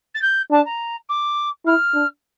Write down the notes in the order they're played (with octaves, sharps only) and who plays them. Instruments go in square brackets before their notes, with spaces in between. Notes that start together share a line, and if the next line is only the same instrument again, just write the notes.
[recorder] A6
G6
[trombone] D4 [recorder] A5
[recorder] A#5
D6
[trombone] E4 [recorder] F6
[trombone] D4